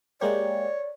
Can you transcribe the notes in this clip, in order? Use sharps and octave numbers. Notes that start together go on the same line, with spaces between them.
G#3 A#3 G4 C#5 D5